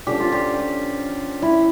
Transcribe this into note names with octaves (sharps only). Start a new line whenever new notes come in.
D3 F3 C#4 G4
F4
G4
E4